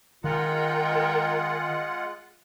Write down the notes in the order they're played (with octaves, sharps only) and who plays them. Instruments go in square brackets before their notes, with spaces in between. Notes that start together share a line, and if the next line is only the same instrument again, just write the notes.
[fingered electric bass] D#3 [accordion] G#3 F4 F#5 [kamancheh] A#4 G5